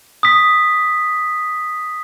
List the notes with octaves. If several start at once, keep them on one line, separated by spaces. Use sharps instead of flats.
D#6 B6